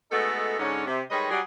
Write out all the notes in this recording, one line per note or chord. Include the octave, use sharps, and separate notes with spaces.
G#3 A3 B3 D#4 F#4 A4
G#2 D3 C#4
C3
D#3 G3 G#3 B4 C#5 D#5
F#3 G3 G#4